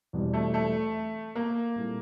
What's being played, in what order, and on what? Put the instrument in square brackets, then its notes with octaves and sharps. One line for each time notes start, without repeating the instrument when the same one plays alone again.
[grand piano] E2 B2 G3 C4
[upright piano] A3
A3
A#3
[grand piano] A#2 G3 C4 E4 A4